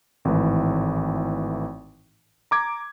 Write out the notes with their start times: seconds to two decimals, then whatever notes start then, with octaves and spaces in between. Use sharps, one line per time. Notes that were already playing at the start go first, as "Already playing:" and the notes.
0.25 G#1 A2 E3
2.51 A#5 D6 G#6